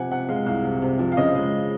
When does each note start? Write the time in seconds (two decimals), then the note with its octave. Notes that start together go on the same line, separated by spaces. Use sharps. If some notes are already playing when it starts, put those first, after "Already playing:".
Already playing: C3 F3 F#5 G#5
0.11 C3 F#5
0.29 G#3 F5
0.46 C2 F5
0.64 C3
0.82 C3
0.99 F3
1.12 F5
1.17 C#3 D#5
1.35 G#3